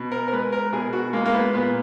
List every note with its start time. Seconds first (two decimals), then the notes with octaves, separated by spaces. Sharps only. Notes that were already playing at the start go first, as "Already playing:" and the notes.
Already playing: B2
0.11 A#4
0.28 A#4
0.32 G#3 B4
0.52 A#4
0.72 B2 G#4
0.93 F#4
1.13 G#3 A#3
1.25 A#3
1.33 B3
1.54 A#2 B3